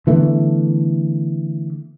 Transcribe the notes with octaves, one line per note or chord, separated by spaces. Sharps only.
D3 E3 A3 B3